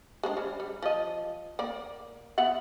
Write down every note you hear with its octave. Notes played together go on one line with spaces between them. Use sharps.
G#3 D4 C5
G3 C#4
G3
F3 D#5
A#3 D5
B3 E5 F#5